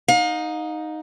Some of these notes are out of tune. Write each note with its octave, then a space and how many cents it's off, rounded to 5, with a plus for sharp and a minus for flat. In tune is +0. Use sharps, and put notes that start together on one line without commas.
D#4 +0 F5 +40